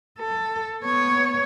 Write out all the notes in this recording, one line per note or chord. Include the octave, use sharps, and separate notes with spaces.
A4
B3 C#5